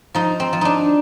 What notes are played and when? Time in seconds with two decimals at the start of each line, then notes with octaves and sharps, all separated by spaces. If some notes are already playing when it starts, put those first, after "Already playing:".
0.15 F3 D#4
0.40 C4
0.53 F3
0.61 D4 D#4